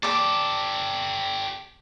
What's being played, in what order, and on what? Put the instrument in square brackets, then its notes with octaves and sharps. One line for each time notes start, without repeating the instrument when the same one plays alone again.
[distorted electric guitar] G4 A4 [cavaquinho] D5 D6